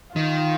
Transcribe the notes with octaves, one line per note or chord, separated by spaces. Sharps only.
D#3 F4